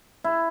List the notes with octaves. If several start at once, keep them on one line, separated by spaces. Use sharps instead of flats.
E4